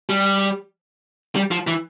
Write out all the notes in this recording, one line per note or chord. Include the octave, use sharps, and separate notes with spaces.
G3
G3
F3
E3